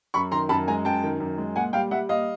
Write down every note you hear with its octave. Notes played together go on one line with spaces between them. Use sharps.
F#2 B5 C#6
D#3 A#5 C6
F#2 A5 B5
G#3 G#5 A#5
F#2 G5 A5
D#3
F#2
G#3
A#2 F#5 G#5
G3 F5 G5
G3 E5 F#5
A#2 D#5 F5